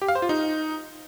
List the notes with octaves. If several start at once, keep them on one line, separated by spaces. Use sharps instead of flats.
G4
F5
C5
F4
D#4